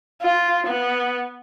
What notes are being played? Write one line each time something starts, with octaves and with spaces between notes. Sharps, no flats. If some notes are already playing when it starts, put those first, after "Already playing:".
F4
B3